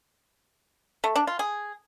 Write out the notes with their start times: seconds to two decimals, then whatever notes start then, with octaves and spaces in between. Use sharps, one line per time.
1.04 A3
1.16 D4
1.27 F4
1.39 G#4